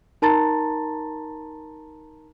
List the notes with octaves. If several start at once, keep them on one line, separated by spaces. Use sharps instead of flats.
D#4 A#4 A5 A#5 C6 A6